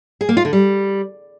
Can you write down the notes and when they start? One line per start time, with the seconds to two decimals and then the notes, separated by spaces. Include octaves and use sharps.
0.21 G#4
0.29 A#3
0.37 F4
0.45 D3
0.53 G3